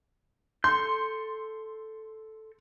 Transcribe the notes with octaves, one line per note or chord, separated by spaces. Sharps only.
A4 C6 G6